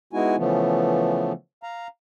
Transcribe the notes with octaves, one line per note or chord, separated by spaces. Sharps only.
G#3 B3 D#4 E4 F#4 G#5
C#3 E3 F3 A3 B3
F5 A#5